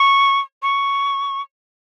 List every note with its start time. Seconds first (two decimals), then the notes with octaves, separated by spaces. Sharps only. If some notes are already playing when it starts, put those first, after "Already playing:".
Already playing: C#6
0.63 C#6